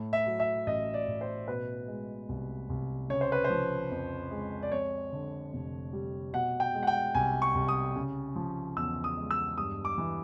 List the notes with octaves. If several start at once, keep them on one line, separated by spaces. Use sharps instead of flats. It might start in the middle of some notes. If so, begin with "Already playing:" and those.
Already playing: A2
E5
F#3
E5
A1 D#5
D5
A1
C5
B2 B4
G#3
C2
C2
C#3 C#5
C5
B4
C5
F3
F2
G#3
D5
F2 C#5
D3
F1
G3
B2 F#5
G5
G#3
F#5
G5
C2 G#5
C#6
C2
D#6
C#3
F3
E2 E6
D#6
G#3
E6
G2 D#6
D6
E3